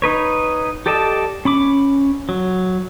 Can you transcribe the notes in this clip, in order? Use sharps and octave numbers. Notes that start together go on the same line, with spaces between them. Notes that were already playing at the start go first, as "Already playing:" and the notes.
D#4 B4 C#5
G4 A4 D5 D#5 A5
C#4 B5 D6
F#3